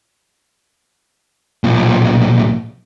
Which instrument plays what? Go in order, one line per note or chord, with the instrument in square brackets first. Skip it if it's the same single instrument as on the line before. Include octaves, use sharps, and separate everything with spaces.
[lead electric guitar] B1 A#2